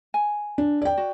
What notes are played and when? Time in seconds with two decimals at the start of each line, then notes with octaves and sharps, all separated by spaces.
0.14 G#5
0.58 D4
0.82 D5 G5
0.98 F#4